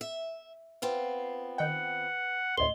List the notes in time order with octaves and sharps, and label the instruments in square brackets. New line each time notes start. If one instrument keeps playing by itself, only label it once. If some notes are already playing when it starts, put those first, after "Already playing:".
[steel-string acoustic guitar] E5
[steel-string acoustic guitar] B3 C4 F4 [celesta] B4
[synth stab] D#3 G5 [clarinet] F#5
[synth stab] A1 D2 A2 [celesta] D#5 G7 [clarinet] C6